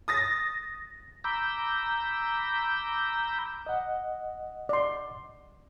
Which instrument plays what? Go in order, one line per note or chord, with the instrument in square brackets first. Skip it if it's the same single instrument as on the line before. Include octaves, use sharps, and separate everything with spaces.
[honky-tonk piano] D#6 A6 A#6
[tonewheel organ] A#5 B5 D6 E6 G6
[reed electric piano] D#5 F#5
[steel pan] D5 C6